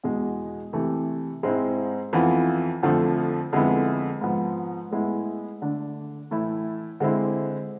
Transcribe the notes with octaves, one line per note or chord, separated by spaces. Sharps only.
E2 B2 G#3
C3 E3 A3
G#2 G#3 C4 E4
F2 E3 B3 F4
F2 D3 F3 A3
F2 D3 G#3 B3 E4
G#2 F3 B3
A2 G#3 B3 E4
D3 A3 D4
A2 E3 A3 E4
D3 G#3 C4 E4